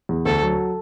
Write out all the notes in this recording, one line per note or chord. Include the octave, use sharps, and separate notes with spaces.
E2
D2 A4
F#3